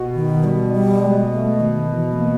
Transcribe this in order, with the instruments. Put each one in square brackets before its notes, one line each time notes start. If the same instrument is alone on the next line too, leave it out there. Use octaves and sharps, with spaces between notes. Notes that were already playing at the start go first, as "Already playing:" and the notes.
Already playing: [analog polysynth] B2
[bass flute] D#3
G3
G3
G#3
A3
D#3
E3
A3
A#3